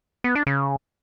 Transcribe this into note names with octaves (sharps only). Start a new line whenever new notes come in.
B3
D4
C#3